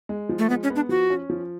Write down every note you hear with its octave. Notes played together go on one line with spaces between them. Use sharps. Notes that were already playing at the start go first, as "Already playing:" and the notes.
G#3
F3
A3
G#3 B3
C#4
B3
D4
F3 F#4
C#4
F3